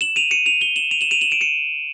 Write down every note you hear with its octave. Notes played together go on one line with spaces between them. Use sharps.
E7 F#7
D#7 F7
C#7 D#7
D#7 F7
F7 G7
E7 F#7
D#7 F7
E7 F#7
D#7 F7
E7 F#7
D7 E7
C#7 D#7